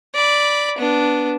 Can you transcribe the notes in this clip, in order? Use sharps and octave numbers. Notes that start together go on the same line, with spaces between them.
D5 B5
B3 D4